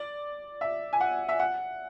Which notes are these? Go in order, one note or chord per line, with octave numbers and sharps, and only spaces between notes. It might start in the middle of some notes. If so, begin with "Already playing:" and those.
Already playing: D5
E5
G#5
F#5
E5
F#5